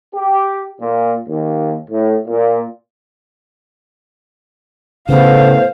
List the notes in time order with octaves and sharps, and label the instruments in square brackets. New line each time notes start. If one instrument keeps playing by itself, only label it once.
[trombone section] G4
A#2
D#2
A2
A#2
[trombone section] A2 B3 [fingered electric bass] C#3 [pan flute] C5 [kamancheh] F5